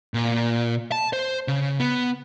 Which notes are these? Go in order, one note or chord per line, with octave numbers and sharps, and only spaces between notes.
A#2
A5
C5
C#3
B3